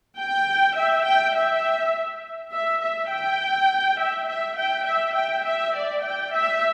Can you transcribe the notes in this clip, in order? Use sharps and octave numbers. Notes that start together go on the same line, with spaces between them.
G5
E5
G5
E5
E5
E5
G5
E5
E5
G5
E5
G5
E5
D5
G5
E5